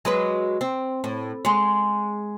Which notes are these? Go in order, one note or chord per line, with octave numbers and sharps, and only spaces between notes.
F#3 G#3 B4
C4
A2
G#3 C#5